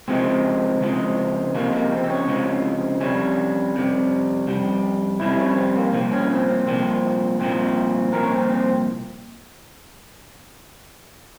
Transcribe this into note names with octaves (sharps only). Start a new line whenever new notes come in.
C#2 C3 F3 G#3 C4
C#2 C3 F3 G#3
C#2 C3 F3 G#3 A#3
A#3
C4
C4
C#4
C#2 C3 F3 G#3
F2 C3 G3 C#4
F2 C3 G3
F2 C3 G3
F2 C3 G3 E4
C#4
C4
A#3
C2 A#2 F3 C4
C#4
C4
C4
C2 A#2 F3 C4
C2 A#2 F3 C4
C2 A#2 F3 A#4
C#4
C4
C4